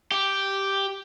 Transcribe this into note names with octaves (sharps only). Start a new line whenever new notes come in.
G4